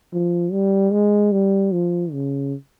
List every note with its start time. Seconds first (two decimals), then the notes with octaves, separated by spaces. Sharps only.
0.13 F3
0.52 G3
0.93 G#3
1.32 G3
1.72 F3
2.12 C#3